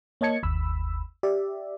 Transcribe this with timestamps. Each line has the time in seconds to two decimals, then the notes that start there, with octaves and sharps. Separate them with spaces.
0.21 A#3 C#5 D#5 A5 G#6 C#7
0.43 G1 D#2 B5 E6
1.23 G4 D5 E5